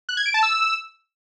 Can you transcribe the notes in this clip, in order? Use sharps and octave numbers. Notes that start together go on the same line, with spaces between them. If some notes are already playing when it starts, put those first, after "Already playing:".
F#6
G#6
D7
A5
E6